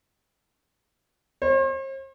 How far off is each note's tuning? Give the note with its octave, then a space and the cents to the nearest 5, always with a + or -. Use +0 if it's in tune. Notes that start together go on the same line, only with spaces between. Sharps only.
C5 +45